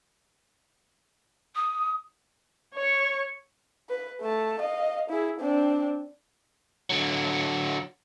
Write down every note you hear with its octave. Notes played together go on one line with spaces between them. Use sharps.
D#6
C#5 C#6
B4
A3 A5
D#5 F5
E4 G#4
C4 D4
D3 F#3